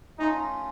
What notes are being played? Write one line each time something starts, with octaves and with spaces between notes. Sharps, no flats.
A3 C#4 D#4 F4